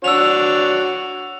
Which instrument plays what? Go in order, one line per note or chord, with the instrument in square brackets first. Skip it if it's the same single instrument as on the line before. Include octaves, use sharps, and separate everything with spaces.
[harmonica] D4 F#4 C#5 [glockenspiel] E6 F7